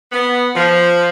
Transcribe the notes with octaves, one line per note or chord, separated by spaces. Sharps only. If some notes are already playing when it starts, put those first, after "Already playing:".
B3
F3